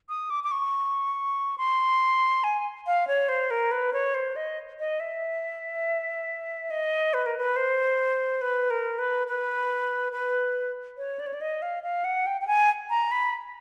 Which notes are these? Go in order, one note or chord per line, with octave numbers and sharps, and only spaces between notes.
D#6
D6
D6
C#6
C6
G#5
F5
C#5
C5
A#4
B4
C#5
C5
D#5
D#5
E5
D#5
B4
A#4
B4
C5
B4
A#4
B4
B4
B4
C#5
D5
C#5
D5
D#5
F5
F5
F#5
G5
G5
G#5
A#5
B5